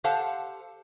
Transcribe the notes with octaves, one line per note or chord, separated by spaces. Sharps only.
G4 A4 C5 F5 F#5 A5